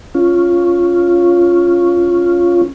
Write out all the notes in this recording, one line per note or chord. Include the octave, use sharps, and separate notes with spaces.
C#4 F4